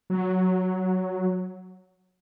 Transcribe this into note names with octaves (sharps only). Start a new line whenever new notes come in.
F#3